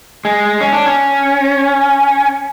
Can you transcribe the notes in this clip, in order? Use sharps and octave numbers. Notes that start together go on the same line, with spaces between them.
G#3
C#4
D4
C#4